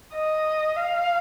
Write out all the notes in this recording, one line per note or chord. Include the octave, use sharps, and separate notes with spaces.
D#5
F5